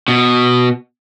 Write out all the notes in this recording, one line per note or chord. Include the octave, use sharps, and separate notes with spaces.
B2